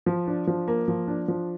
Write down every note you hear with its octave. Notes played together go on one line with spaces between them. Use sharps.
F3
D4
F3
A#3
F3
D4
F3